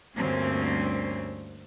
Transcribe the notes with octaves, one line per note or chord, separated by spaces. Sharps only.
D2 G2 A#3 C4 C#4